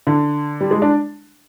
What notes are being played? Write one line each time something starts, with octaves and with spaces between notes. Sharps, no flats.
D3
G3
G#3
D4